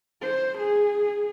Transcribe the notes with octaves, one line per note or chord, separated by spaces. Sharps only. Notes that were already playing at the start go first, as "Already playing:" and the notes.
C5
G#4